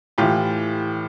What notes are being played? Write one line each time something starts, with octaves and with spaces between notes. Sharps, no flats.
A2 E3 F4 G4